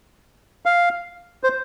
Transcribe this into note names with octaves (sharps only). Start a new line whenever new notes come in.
F5
C5